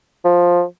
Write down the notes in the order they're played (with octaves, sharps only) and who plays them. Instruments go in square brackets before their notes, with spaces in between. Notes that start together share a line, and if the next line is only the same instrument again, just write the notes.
[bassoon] F3